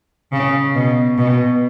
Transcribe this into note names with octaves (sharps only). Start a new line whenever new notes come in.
C#3
B2
B2